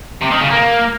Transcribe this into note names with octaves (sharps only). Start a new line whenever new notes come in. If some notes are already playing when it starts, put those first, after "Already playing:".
C3
D#3
C#3
A#3